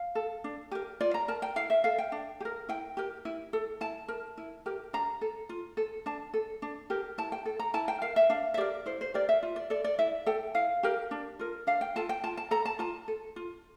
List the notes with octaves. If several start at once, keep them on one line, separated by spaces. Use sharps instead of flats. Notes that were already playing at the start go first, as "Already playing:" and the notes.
Already playing: F5
A4
D4
G4 A#4
F4 D5
A#5
A#4 A5
G5
E4 F5
E5
A4 F5
G5
D4
G4
A#4
E4 G5
G4 A#4
E4
A4
E4 A5
A#4
E4
G4 A#4
D4 A#5
A4
F4
A4
D4 A5
A4
D4
G4 A#4
E4 A5
G5
A4
A#5
E4 A5
G5
A#4 F5
E5
D4 F5
E5
G4 A#4 D5
E4 C5
C5
G4 A#4 D5
E5
F4
D5
A4 D5
D5
E4 E5
A4 G5
E4 F5
G4 A#4
D4
F4 A#4
D4 F5
G5
F4 A4 A5
G5
F4 A5
A5
A4 A#5
A5
F4 A5
A4
F4